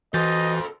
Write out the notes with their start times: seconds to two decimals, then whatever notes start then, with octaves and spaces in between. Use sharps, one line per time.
0.14 E3 F#4 A4 C5 D#5 G6 A6